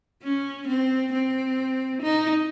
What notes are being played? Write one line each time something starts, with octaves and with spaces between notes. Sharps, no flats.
C#4
C4
C4
D#4